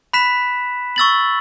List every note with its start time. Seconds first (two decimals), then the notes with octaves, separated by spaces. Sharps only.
0.13 B5 F#6 B6 E7
0.96 C#6 E6 A6 F#7